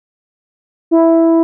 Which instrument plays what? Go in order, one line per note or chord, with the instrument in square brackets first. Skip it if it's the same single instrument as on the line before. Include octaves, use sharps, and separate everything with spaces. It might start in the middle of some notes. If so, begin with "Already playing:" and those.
[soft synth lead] E4